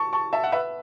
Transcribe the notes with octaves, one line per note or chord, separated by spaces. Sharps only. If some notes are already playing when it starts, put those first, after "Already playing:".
Already playing: A5 C#6
A5 C#6
E5 A5
F#5
B4 E5